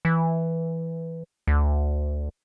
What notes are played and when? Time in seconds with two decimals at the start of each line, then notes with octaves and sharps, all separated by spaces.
0.05 E3
1.47 D2